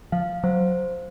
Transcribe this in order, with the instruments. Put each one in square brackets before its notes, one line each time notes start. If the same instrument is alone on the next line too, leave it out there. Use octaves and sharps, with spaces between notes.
[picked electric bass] F3 [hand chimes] F5
[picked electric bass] F#3 [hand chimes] C5